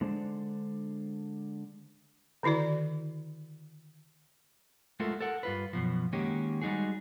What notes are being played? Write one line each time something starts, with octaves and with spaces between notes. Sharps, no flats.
D3 G#3 D4 C5
D3 D#3 E4 F#4 D5
G#3 A3 F4 F#4 A4 A#4
A4 A#4 F#5
G2 F4 B4
F#2 B2 F3
D#3 G#3 A#3 C#4 F#4 G4
G3 G#3 D#4 F#4 G#4